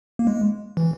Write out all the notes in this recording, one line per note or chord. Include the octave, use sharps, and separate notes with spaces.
A#3
G#3
E3